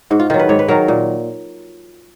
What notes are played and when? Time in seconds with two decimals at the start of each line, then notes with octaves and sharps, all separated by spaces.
0.10 G#2 F#4
0.20 F4
0.30 D#3 F#3 F4
0.39 B4
0.49 G#2 C#5
0.59 B4
0.68 D#3 F#3 A#4
0.88 A#2